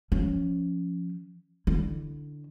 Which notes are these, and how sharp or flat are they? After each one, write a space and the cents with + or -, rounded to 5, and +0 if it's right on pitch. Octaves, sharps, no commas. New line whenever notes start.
F3 +0 C#4 +5
D3 +0 E4 +5